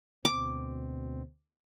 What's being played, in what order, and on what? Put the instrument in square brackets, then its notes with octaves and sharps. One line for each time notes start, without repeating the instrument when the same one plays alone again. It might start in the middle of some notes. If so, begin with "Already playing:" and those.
[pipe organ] D2 B2 C4 [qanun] D6